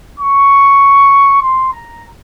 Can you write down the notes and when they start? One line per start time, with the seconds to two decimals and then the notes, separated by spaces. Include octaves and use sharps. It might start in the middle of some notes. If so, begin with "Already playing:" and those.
0.20 C#6
1.42 C6
1.73 A#5